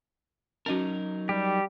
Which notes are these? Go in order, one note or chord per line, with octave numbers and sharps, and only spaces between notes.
F#3 C#4 D#4 F#4 A#4
G3 G4